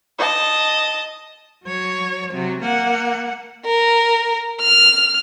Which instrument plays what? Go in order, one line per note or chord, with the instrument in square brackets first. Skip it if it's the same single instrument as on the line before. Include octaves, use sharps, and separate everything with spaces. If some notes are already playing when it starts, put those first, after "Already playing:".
[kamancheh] D#5 A5
[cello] F#3 C#5
C3 F#3
A#3 F#5
[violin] A#4
F6